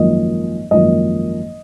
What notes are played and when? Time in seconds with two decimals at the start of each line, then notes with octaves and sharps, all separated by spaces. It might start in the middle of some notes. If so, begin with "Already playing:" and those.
Already playing: G#1 F#2 F3 A#3 D#5
0.71 G#1 F#2 F3 A#3 D#5